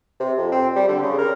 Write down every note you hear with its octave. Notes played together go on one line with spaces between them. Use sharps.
C3
F2
C4
G3
D3
C#3
A#4